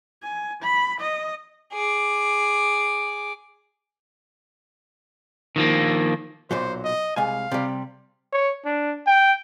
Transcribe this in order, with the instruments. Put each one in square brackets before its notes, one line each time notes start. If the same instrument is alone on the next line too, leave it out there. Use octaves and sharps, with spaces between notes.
[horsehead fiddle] G#5
B5
D#5
[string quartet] G#4 D6
[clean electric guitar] D#3 F3 A#3
[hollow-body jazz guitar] B1 A#2 F#3 [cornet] C5
[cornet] D#5
[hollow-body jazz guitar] C2 G#3 G#5 [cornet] F5
[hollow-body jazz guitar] C3 G3
[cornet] C#5
D4
G5